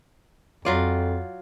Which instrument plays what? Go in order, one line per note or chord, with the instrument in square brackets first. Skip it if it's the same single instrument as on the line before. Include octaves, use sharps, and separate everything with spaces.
[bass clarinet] F2 [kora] F#3 F4 D5